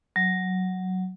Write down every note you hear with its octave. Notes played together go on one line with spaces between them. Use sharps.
F#3